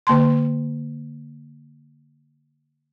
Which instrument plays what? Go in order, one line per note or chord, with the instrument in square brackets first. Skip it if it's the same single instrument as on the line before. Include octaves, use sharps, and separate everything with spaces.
[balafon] D3 A#3 A5 C6